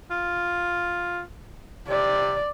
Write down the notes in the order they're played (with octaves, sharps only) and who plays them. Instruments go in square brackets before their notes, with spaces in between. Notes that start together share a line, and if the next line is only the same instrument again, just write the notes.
[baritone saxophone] F4
[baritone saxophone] C3 [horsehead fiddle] D5